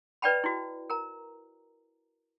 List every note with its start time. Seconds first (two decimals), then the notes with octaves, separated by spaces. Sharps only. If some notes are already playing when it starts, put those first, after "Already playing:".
0.22 B4 D5 D#5 G5 A5 B5
0.44 E4 F#4
0.90 A#4 A#5